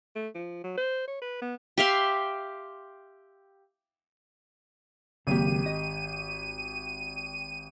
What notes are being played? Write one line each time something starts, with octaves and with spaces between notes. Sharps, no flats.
A3
F3
F#3
C5
C#5
B4
B3
G4 E5 F5 C6
G#1 C#3 F#3 A#3 G4 D#7
D#5